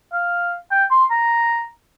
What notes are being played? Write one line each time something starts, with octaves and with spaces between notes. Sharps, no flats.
F5
G5
C6
A#5